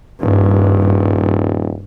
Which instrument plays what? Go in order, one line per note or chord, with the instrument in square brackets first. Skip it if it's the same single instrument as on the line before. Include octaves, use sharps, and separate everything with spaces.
[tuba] D#1 [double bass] G2